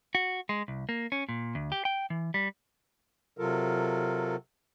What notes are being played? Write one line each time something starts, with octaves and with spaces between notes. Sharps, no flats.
F#4
G#3
C2
A#3
C#4
A#2
D2
G4
G5
E3
G3
C3 F#3 F4 A4 A#4